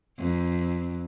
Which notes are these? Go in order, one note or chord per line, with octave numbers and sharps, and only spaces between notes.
F2